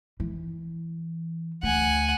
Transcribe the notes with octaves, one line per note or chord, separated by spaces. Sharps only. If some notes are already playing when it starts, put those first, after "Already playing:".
E3
D2 F#5 G#5